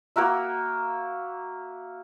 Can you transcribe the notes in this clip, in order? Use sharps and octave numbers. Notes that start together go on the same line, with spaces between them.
A#3 F#4 A#4 E5